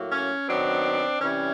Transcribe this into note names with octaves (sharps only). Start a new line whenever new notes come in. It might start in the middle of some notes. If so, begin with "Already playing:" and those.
Already playing: A2 F#3 A#3
C#4
D#3 F#3 B3 C4 D4
C3 E3 G3 C#4